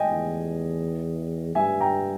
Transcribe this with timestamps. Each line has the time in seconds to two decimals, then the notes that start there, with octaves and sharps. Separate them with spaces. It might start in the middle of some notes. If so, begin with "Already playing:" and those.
Already playing: D#5 G5 G#5
0.09 E2
1.55 G2 E5 G#5
1.80 G5 A#5